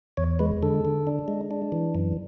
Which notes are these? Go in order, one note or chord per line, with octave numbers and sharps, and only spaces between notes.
E2 C#5
G#3 B4
D3 A4
D3
D4
G#3
D4
E3
F#2